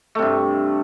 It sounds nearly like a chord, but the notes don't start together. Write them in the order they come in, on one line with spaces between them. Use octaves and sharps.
A3 C3 G2